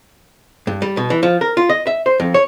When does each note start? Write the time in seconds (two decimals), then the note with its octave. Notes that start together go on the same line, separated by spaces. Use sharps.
0.67 G2
0.82 G3
0.97 B2
1.10 E3
1.23 F3
1.41 A#4
1.57 F4
1.69 D#5
1.87 E5
2.06 C5
2.20 F2
2.34 C#5